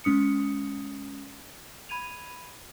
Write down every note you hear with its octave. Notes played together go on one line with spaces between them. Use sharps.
G#3 C#4 D#6 C#7
B5 G#6 D#7 F7